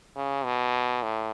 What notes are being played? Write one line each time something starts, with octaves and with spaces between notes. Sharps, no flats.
C#3
B2
A2